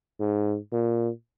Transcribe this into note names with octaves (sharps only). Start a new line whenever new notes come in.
G#2
A#2